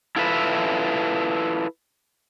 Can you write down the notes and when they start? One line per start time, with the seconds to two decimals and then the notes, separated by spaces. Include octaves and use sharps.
0.16 E4 F4 A4 B4 E5